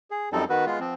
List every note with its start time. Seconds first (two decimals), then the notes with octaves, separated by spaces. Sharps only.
0.11 G#4
0.33 F#2 F3 G3 C4 D#4 A4
0.50 D#3 B3 F#4 B4
0.66 G#3 B3 F4
0.80 F3 C4